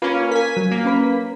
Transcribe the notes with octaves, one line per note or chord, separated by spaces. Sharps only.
A#3 C#4 F4 B4
A#4 G#5 B6
F#3
A#3
C#4 B4 B6